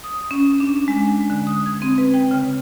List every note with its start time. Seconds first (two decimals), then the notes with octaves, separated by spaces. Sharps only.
0.04 D#6
0.31 C#4
0.60 D4
0.88 G#3
1.30 D3
1.47 D#6
1.66 G#6
1.82 C4
1.98 B4
2.14 G5
2.31 C#3